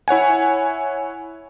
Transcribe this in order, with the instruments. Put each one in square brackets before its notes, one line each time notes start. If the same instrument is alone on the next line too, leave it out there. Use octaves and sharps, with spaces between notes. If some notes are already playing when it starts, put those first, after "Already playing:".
[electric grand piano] E4 C#5 F#5 G#5